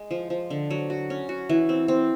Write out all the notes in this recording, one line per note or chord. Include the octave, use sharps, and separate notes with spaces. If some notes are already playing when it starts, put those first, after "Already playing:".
Already playing: G#3
F3
F3
D3
F#3
F#4
C#4
F#4
E3
C4
C4